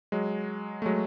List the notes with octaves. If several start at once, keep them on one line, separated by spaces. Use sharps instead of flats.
F#3 G#3
A3
F#3 G#3